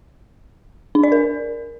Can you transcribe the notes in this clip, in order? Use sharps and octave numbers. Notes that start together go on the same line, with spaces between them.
D4
D5
A#4